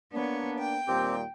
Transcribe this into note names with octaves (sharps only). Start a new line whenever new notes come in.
A#3 B3 D4 C#5
G5
D#2 A#2 G3 C4 G4